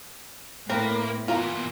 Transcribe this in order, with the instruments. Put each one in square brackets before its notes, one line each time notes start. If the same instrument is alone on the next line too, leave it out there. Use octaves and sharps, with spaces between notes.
[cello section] A2 [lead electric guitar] A#3 [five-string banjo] C4 A#4 B4
[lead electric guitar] A#2 E3 [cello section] B3 [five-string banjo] F4 A#4